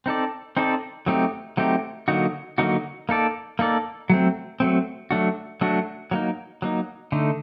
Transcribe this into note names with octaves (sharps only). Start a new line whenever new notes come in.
C4 D#4 A4 D5
C4 D#4 A4 D5
F#3 A3 C4 D#4 G4
F#3 A3 C4 D#4 G4
D3 F#3 A#3 D#4 F#4
D3 F#3 A#3 D#4 F#4
A#3 D#4 A4 D5
A#3 D#4 A4 D5
F#3 A3 C4
F#3 A3 C4
F#3 A3 D4 F#4
F#3 A3 D4 F#4
F#3 A#3 D#4
F#3 A#3 D#4
D3 A3 D#4